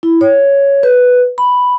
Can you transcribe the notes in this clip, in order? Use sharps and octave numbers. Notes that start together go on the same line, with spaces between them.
E4
C#5
B4
B5